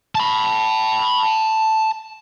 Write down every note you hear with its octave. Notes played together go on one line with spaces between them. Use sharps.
A5 B5